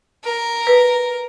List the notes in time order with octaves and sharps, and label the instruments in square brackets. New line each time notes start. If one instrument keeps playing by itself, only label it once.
[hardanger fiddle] A#4
[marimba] B4